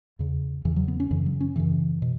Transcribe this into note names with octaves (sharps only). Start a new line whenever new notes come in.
E2 C#3
E2 C#3 E3
F#3
B3
C#4
F#2 C#3 E3
F#3
C#4
F#2 C#3 E3
B2